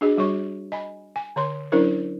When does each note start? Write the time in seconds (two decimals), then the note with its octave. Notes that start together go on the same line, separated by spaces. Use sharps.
0.01 D4 F#4 G#4 D#5
0.18 G3 F#4 C#5 C#6
0.72 D#5 G#5 B5
1.16 G#5
1.36 D3 C#5 C6
1.72 F#3 C#4 D4 E4 A#4 C5